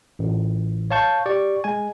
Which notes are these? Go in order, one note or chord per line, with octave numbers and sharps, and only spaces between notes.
A1
C#5 F5 A5 C#6 G6
G4 D5 C#6
G#3 G#5